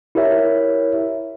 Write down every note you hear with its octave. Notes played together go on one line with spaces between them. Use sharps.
E4 G4 A#4 C#5 E5